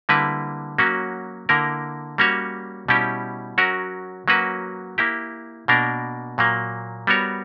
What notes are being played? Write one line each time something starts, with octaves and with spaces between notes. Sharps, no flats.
D3 G3 A#3 E4 B4
F#3 A#3 C#4 F#4
D3 A#3 E4 A#4
G3 A#3 C#4 F#4 C#5
B2 G3 C#4 E4 G4
F#3 C#4 F#4 A#4
F#3 A#3 C#4 F#4 B4
A#3 E4 G4
B2 A#3 D4 A#4
A#2 F#3 A#3
G3 B3 F#4 A#4 C#5